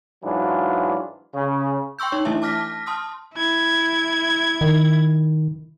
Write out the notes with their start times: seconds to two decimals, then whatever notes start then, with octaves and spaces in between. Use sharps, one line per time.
0.24 G#2 E3 F#3 D4 F4
1.35 C#3
1.99 G5 C6 C#6 E6 G6
2.12 D#4 C#5
2.25 E3 A3 D4 E4 E5 A5
2.42 A5 D6 F6 A#6 B6
2.86 A5 C6 D#6 F6
3.35 E4 G#6
4.61 D#3